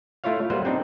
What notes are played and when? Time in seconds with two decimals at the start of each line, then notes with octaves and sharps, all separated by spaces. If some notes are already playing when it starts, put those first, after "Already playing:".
0.24 A3 E4 F4 C#5 F5
0.50 F#3 G3 A#3 B4 C5 F#5
0.65 C4 D4 D#4